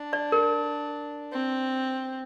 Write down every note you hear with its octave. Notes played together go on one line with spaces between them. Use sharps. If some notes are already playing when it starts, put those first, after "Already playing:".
Already playing: D4
D5
A#4
C4